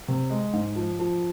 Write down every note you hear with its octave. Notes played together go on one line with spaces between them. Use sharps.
C3
G#3
G#2
F3
F3